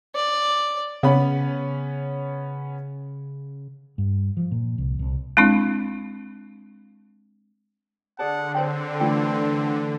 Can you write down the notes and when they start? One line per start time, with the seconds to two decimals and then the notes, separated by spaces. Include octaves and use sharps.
0.15 D5
1.03 C#3 B3 C#4 B5
3.98 G2
4.37 F3
4.51 A#2
4.78 C2
4.99 C2
5.37 G#3 C4 D4 E4
8.19 D3 G#4 D5 F#5 A5
8.55 C4 C5 C#5 G5
9.00 E3 A3 D4 F4 G5